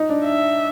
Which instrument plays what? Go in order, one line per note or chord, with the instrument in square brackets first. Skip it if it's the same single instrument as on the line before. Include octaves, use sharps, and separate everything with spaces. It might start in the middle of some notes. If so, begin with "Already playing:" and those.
Already playing: [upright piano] D#4
D4
[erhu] E5